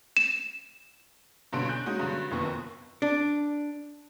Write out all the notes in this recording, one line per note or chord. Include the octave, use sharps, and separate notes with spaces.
E7
G2 B2 D3 C#4 C6 D7
G#5 F#6 G6
G#3 C#4 D#4 F#4
G2 D3 F#3
F#1 F2 D#3 B3 C#6
D4